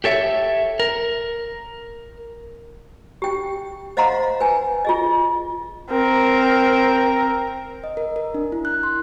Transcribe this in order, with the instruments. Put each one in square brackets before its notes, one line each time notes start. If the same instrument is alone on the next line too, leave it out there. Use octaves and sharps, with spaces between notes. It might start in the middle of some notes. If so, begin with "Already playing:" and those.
[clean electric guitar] G4 A4 C#5 E5
A#4
[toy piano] G4 G5
C5 D#5 F5 F#5 A#5 C6
B4 G#5
F4 G#4 D#5
[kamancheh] C4 A#4
[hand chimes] D#5
A#4
A#4
D4
E4
F#6
C6